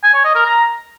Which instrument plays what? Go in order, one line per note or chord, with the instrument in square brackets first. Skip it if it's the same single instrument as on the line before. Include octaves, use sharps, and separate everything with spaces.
[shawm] G#5
C#5
D#5
A#4
A#5